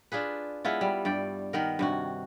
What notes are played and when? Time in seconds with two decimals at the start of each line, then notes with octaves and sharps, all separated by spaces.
0.12 D4 F4 G#4 B4
0.65 G#3 B3 E4 F4
0.81 G3
1.05 G2 D5 G5
1.53 D#3 B3 A#4
1.79 G2 C3 F#4